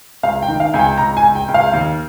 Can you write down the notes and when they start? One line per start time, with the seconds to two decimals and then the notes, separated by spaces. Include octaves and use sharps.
0.23 C#2 F5
0.42 G5
0.48 D#3
0.60 F5
0.74 C#2 G#5
0.79 G5
0.97 C#2 A#5
1.17 G#5
1.23 C#2
1.35 G5
1.48 C#2
1.54 F5
1.73 D#2